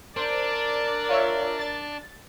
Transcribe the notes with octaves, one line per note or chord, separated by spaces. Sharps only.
D4 A#4 C5 D5
F4 C#5 E5
A6